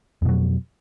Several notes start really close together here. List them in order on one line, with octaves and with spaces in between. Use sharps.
F2 B2 F#3